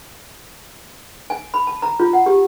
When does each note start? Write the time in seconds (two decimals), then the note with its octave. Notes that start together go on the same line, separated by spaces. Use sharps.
1.30 G#5
1.54 B5
1.67 A5
1.82 A#5
2.00 F4
2.13 F#5
2.26 G4